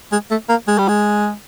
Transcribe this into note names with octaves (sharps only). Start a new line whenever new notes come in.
G#3
A3
A#3
G#3
G3
G#3